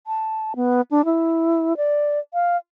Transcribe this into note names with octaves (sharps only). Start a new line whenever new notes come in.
A5
B3
D4
E4
D5
F5